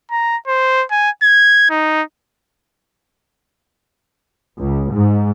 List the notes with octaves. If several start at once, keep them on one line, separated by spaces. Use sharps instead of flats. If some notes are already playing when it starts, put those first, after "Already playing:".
A#5
C5
G#5
G#6
D#4
C#2
G#2